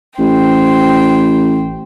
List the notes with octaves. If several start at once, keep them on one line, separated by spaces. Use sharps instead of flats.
A1 C5 G5